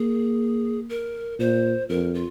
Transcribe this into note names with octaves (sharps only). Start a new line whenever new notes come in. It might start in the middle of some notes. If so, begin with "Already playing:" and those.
Already playing: A#3 G#4
A#4
A#2 C5
F2 A#4
F4